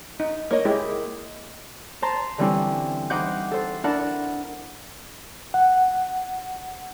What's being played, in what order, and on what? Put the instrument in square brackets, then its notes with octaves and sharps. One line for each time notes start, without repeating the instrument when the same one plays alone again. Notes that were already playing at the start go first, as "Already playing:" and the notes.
[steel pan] D#4
[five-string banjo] A#3 C#5 D#5
[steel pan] G#3 E4 G4
[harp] C5 A5 A#5 C6
D3 E3 G3 C4 C#4 E4
E3 D#4 C5 F#5 D6 G6
A4 C5
D4 E4 A#4 F#5 A5
[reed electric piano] F#5